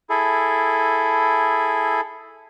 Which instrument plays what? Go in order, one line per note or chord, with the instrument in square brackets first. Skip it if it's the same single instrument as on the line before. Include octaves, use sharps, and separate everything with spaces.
[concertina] E4 G#4 A4